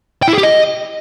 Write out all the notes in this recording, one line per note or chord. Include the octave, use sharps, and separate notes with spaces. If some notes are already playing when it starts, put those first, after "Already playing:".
G5
E4
G#4
G4
D#5